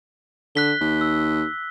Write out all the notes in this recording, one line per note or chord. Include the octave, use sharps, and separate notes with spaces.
D3 F#6 B6 G7
D#2
E6